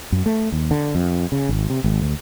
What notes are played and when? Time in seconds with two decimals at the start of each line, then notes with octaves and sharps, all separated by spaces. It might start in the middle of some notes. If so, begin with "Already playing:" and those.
0.12 F#2
0.26 A3
0.52 D#2
0.71 D3
0.95 F2
1.32 C#3
1.49 G#1
1.70 C3
1.84 G#1
2.01 D2